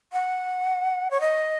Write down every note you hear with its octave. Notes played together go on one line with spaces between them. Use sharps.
F#5
C#5
D#5